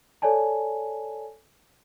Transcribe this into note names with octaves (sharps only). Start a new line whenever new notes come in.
A4 C#5 D5 G#5 A5